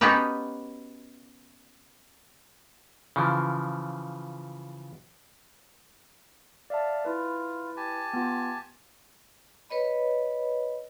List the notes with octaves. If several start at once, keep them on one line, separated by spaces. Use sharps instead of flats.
B3 C#4 D#4 F#4 G4 B4
C#3 E3 F3
D5 E5 F5 A5
E4 F4 B4
G4 G#5 A5
B3 F4
B4 C#5 D#5 B5